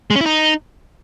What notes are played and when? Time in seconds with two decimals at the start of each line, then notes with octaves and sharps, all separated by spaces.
0.10 G#3
0.16 C#4
0.21 E4
0.26 D#4